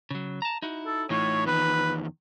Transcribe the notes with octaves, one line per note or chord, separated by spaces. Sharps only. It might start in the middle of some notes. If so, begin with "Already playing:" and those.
C#3 F#3
A5 A#5
D#4 E4 F#4
A4
A2 E3 D#4 F4 C#5
E2 D#3 B4